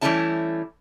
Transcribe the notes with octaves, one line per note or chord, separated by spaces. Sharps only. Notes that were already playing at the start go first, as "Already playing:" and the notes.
E3 G3 A3 C#4 E4 A5